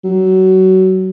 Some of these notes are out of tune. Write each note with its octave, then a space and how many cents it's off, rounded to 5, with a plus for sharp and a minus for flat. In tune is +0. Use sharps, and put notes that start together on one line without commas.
F#3 +25